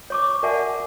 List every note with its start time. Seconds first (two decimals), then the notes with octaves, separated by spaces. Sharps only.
0.10 C#5 C#6 D6
0.43 A#4 D5 E5 F#5 G#5 A5